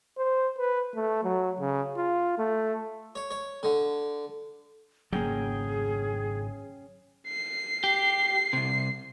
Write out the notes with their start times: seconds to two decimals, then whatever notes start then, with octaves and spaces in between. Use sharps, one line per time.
0.18 C5
0.59 B4
0.95 A3
1.24 F#3
1.60 C#3
1.96 F4
2.38 A3
3.15 C#5
3.31 C#5
3.63 D3
5.13 G#1 C#3 F#3 A#3 C#4 G#4 G5
7.29 C7
7.84 G4
8.53 C2 C3